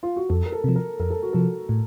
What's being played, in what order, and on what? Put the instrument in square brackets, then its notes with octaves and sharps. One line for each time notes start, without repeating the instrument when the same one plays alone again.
[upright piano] F4
F#4
[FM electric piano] F2 [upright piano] A4
[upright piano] A#4
A4
[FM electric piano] C3 F3
[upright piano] A#4
[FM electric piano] F2 [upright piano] A#4
[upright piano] A4
F#4
[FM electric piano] C3 F3 [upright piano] A4
[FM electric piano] A2